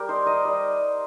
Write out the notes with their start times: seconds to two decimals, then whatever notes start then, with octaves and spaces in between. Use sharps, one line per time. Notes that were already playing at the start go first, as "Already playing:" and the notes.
Already playing: G3 G4 A#4
0.09 D#4 C5
0.26 D#4 D#5
0.45 G3